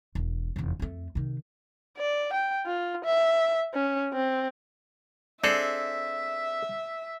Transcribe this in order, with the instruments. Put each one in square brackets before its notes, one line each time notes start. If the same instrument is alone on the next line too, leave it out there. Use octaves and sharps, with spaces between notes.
[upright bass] E1
F1 E2
F2 A3
C3 D#3
[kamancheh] D5
G5
F4
E5
C#4
C4
[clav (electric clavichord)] C4 G#4 A4 [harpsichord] D4 [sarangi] E5